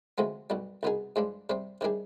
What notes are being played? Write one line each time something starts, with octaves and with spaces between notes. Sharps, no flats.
D2 C3 F3 G#3 B3
B1 B2 G3
C2 B2 B3 D#4 G#4
G2 F3 G#3 D4
C3 G3 C4
C3 D#3 G3 D4 G#4